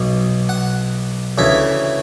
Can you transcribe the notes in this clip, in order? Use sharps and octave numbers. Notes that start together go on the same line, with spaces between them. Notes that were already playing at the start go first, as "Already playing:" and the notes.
Already playing: B1 B2
F#5
D2 C#3 E3 E5